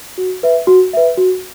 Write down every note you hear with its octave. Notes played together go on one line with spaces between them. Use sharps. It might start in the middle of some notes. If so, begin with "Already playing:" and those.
F#4
B4 E5
F#4
B4 E5
F#4